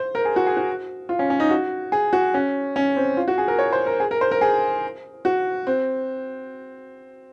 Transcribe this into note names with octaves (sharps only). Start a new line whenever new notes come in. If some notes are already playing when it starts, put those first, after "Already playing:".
Already playing: C5
A#4
G#4
F#4
G#4
F#4
F4
C#4
C#4
D#4
F#4
G#4
F#4
C#4
C#4
C4
F4
F#4
G#4
A#4
C#5
C5
A#4
G#4
A#4
C5
A#4
G#4
F#4
C4